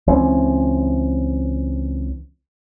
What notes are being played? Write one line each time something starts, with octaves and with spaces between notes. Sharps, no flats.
C#2 E3 C4 C#4